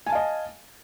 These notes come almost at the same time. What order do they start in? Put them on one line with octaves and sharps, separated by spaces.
G#5 A5 F5 D#5